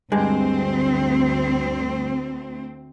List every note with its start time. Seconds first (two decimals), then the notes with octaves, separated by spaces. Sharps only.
0.12 D2 G2 G#3 C4